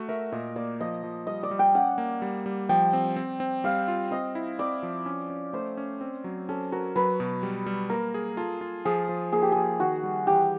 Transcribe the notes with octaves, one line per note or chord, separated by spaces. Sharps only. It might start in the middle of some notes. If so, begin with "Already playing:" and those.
Already playing: A3 F#4
A#4 E5
A#2 D#5
A#3 D5
F3 D#5
F3
G3 D#5
D5
G3
G5
C#4 F#5
A#3
G3
G3
F3 G5
C4
C4
C4
G3 F5
F4
C4 D#5
E4
C4 D5
F3
C#4
C#4
A3 C5
C#4
C4
F#3
C#4 A4
F#4 A#4
F#3 B4
B2
G3
G3
A#3 A#4
G#4
F4 A4
F4
F3 G#4
F3
A#3 G#4
G4
F3 G#4
D#3 F#4
G3
E3 G4